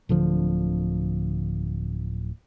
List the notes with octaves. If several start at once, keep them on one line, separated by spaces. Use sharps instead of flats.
D1 D3 F3